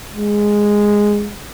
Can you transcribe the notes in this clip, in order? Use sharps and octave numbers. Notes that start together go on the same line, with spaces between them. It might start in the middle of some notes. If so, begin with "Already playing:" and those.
G#3